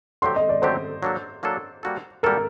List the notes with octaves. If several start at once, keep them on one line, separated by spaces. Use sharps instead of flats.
D3 F#3 A3 C4 G4 C6
D#5
D5
D3 F#3 A3 C4 G4 C5
F#3 A#3 D4 A4
F#3 A#3 D4 A4
G3 A#3 F#4 A4
G3 A#3 F#4 A4 A#4